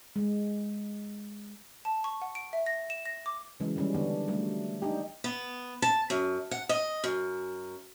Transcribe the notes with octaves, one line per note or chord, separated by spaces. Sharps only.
G#3
A5
C#6
F#5
D7
E5
A#6
E7
A#6
D6
C#3 E3 F#3 G#3
D#3 G3 C#4
D3 B3 D4
F#3 G3 A3
D4 D#4 G4
B3
A5
F#2
F#5
D#5
F#2